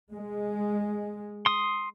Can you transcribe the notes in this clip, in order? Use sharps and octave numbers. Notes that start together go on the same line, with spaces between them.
G#3
C6 D#6